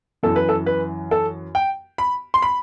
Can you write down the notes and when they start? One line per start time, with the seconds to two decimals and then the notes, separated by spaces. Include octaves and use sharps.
0.23 F#2 E3 A4
0.36 B4
0.49 A4
0.66 B4
1.11 A4
1.55 G5
1.98 B5
2.34 C6
2.42 B5